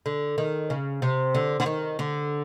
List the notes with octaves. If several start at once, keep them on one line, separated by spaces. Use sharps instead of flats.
D3
D#3
C#3
C3
D3
D3
D#3
D3